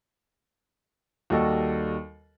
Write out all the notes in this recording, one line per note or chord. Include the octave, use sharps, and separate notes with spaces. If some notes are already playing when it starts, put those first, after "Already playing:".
D#2 G3 F#4 A4 D#5 C#6